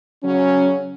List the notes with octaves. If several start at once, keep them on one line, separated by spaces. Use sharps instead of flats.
C#3 F#3 C#4